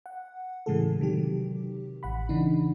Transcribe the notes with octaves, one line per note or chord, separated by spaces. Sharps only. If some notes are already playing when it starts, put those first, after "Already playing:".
F#5
A2 C#3 E3 G#3 G#4 A4
C3 D#3 F#3 G4
A1 F#5 B5
C#3 E3 D4 D#4